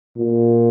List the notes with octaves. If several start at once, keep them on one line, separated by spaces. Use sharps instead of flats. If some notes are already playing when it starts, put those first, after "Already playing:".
A#2